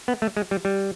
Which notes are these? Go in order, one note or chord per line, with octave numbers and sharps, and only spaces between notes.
B3
A3
G#3
G3
G3